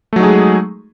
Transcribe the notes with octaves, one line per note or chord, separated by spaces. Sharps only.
F#3 G#3 A3 D#4 G#4